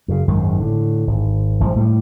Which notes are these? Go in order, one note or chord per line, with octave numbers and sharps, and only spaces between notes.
F#2 C#3
G#1 F#2 D#3 G#3
A2 D3
G#1
G#1 A#2 F3 G3
A2 F#3 G3